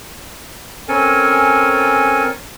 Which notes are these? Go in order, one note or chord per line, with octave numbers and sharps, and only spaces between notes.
C4 C#4 A4 A#4 G#5